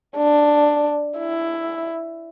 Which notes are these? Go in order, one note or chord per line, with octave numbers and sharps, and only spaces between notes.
D4
E4